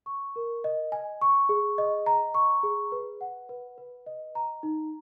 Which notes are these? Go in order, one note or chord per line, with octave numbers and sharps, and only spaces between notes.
C#6
A#4
D#5
G#5
C#6
G#4
D#5
A#5
C#6
G#4
B4
F#5
B4
B4
D#5
A#5
D#4